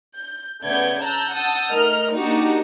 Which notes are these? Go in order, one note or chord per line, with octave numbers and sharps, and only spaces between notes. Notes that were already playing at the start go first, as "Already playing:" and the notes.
G6
C#3 A3 B3 D5 G6 G#6
A5 A#5 E6 F#6 G6
F#5 A5 D#6 E6 G6
A3 D#4 A#4 D#5 F6
A#3 D4 D#4 F#4 G4